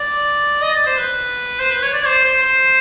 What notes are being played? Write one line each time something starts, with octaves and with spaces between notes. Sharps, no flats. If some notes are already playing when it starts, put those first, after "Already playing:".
Already playing: D5
D#5
D5
C5
B4
C5
B4
C#5
D5
C5
C5
C5